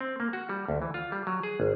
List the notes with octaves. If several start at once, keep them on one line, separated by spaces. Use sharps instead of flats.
C4
A#3
F#4
G3
D2
E3
F4
G3
F#3
G#4
G#1